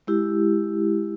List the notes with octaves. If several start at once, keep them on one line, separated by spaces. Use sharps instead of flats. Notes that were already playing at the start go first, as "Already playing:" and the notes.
G#3 E4 G4